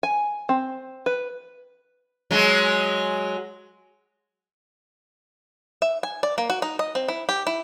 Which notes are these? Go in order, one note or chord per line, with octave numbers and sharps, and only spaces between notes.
G#5
C4
B4
F#3 G#3
E5
G#5
D5
A#3
F#4
D#4
D#5
C4
E4
G4
E4